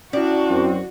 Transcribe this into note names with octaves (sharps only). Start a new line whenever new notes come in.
C#4 D4 E4 F#4
F#2 C4